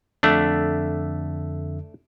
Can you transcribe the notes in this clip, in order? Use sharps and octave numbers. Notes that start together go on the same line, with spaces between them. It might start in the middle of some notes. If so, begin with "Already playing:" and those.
F2 D3 A3 D4 E5